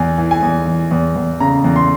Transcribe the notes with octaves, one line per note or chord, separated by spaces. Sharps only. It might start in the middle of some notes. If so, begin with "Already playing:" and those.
Already playing: E2 G#5
E3
G#5
E2
E3
E2
E2
C#3 A#5
E2
C6